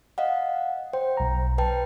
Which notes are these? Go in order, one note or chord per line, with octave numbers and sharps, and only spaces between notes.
D#5 F5 F#5
C5 G5
B1 A#5
B4 G5 A5